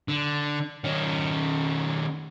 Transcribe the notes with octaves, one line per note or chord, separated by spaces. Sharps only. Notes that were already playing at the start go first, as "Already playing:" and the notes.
D3
D#3 C#4